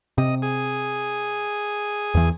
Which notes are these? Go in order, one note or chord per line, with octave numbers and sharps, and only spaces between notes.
C3 D#5
G#4
E2 E3